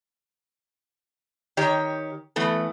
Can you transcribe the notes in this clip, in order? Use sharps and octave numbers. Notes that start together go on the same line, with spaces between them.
D#3 G4 C#5
E3 A3 B3 A4